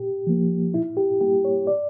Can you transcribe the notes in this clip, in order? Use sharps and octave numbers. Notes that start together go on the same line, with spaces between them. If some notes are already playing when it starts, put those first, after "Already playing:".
Already playing: A#2 G4
F3 A#3
A#2 E4
G4
G3 A#3 G4
C#5
D5